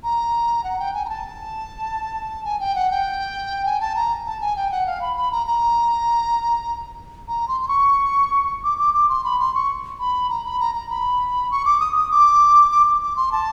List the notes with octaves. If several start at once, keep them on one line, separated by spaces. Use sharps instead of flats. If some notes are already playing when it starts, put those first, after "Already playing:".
A#5
F#5
G5
G#5
A#5
A5
G#5
G5
F#5
G5
G#5
A5
A#5
A5
G#5
G5
F#5
F5
B5
B5
A#5
A#5
A#5
C6
C6
C#6
D6
D6
D6
C6
B5
C6
C#6
B5
A#5
B5
A#5
A#5
B5
C#6
D6
D#6
D#6
D6
D6
D6
D6
C6
A5